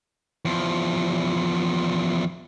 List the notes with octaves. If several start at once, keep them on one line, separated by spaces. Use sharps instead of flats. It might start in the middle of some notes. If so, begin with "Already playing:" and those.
E2 F3